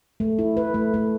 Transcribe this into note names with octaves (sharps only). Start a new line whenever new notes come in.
A3
E4
B4
A3
A3